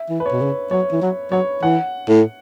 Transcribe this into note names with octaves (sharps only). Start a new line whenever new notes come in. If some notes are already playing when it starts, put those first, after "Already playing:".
Already playing: E5
E3
B4
C#5
B2
C#3
F#3 C#5
E3
F#3
F#3 C#5
E3 F#5
A2